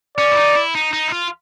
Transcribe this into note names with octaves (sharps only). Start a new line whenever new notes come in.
C#4 D5
E4
D#4
E4
D#4
D#4
E4
F4